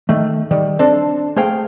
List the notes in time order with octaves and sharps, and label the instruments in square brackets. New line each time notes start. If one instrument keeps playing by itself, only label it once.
[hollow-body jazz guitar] D#3 A3
D#3 G3
C4 D4 A4 C5
A3 G#4 C5 F5 G5